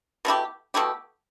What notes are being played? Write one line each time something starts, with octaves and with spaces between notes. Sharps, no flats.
B2 A3 E4 G4
B2 A3 E4 G4